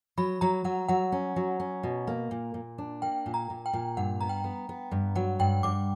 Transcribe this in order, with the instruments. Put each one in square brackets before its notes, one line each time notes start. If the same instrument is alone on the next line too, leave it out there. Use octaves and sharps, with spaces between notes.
[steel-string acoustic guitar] F#3 [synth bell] B5
[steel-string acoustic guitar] F#3 [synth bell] A#5
[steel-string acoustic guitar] F#3 [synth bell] F#5
[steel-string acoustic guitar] F#3 [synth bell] F#5
[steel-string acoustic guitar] C#4
F#3
C#4
B2
A#3
A#2
A#2
D4
[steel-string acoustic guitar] A#3 [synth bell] G5
[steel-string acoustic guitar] A#2
[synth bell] A#5
[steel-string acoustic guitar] A#2
[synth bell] G5
[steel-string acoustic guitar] A#2
[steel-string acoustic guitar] G2 [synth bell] F#5
[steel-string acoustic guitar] B3 [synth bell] A#5
[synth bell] G5
[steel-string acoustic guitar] B3
B3
G2
[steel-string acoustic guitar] F#3 [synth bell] F#5
[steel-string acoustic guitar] G2 [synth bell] G5
[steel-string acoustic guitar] G2 [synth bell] D6